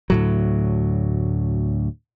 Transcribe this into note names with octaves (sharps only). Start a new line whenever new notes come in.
D2 A2 F#3